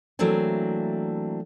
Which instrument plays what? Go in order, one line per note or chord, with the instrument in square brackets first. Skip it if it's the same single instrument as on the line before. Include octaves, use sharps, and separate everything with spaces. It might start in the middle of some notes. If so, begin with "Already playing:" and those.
[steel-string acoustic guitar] E3 F#3 A3 A#3 C4 D4